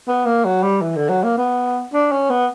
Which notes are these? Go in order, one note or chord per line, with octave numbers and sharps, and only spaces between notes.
B3
A#3
F#3
G3
E3
D3
F#3
A#3
B3
D4
C#4
B3